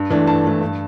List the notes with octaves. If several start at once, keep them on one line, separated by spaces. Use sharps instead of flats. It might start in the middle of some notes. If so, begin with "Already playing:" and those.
Already playing: G2
E3 A3 D4
G2 A5
E3 A3 D4
G2